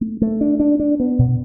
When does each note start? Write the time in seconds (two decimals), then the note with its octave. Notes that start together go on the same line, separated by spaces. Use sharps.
0.01 A3
0.22 A3
0.41 D4
0.60 D4
0.80 D4
1.00 B3
1.19 B2